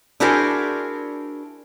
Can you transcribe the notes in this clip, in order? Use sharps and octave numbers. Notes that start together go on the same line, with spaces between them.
D4 E4 F#4 G#4 A#4 C5